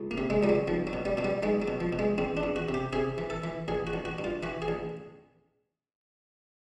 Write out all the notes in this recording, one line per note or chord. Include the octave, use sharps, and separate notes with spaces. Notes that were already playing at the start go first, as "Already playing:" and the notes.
Already playing: C#2
A#3
C3
G#3
C#2 G3
F#3
B1 F3
F#3
B2
G3
B2 F#3
G3
B1 G#3
F#3
B2
F3
B2
G#3
E2 C4
D4
E2
F#4
C3
G4
C3 G#4
E3
A4
E3
A1 G#4
F#4
A1
F#4
G2
F4
E3 F#4
G#4
A1